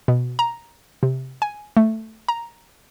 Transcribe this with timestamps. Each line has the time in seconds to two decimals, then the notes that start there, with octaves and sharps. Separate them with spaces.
0.08 B2
0.39 A#5
1.03 C3
1.42 G#5
1.77 A3
2.28 A#5